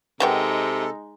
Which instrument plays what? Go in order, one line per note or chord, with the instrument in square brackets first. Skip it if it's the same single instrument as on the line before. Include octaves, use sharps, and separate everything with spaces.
[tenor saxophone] C3 [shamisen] D#3 B3 G5 [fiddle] G#3 D#4 [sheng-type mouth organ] A4